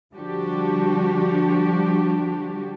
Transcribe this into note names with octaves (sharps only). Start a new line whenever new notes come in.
D3 F3 G3 D4 F#4 G4